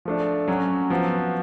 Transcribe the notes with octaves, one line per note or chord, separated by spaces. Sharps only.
F3 A3 D4
F#3 C#4 F#4
F3 B3 F#4